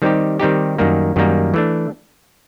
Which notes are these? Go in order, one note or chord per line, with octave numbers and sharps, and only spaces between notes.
D#3 G3 C4 D#4 G4
D#3 G3 C4 D#4 G4
F#2 D#3 G3 A#3
F#2 D#3 G3 A#3
E3 A3 D4